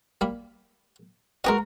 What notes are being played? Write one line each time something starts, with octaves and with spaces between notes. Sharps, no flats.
G3 A#3 B5
G#3 F#4 G4 A#4 B4 D#5